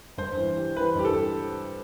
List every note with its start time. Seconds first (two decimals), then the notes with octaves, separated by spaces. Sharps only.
0.18 G2 C5
0.37 E3
0.57 G3
0.76 E3 B4
0.95 G2 G4
1.05 A4